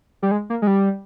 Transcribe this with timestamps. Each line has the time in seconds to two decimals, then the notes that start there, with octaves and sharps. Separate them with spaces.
0.22 G3
0.31 G#3
0.50 A#3
0.62 G#3
0.67 G3